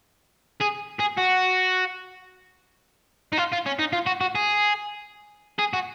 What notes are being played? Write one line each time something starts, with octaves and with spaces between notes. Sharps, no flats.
G#4
G#4
F#4
D#4
F4
F4
C#4
D#4
F4
F#4
F#4
G#4
G#4
F#4